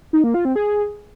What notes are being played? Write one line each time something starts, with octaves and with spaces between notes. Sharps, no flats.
D#4
A#3
F4
C4
G#4